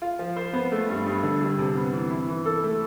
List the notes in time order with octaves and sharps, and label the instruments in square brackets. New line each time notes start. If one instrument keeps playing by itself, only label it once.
[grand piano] F4
F3
C5
B3
A3
G2
G2
D3
G3
C3
B3
E3
E4
E3
A4
A3